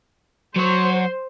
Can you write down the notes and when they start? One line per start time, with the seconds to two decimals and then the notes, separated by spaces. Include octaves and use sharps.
0.56 F#3 C5 C#5